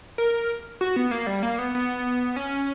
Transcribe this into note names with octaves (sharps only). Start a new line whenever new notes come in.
A#4
F#4
B3
A#3
G3
A#3
B3
B3
C#4